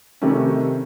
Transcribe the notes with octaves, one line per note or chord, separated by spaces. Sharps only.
C3 D#3 G3 A3 C4 C#4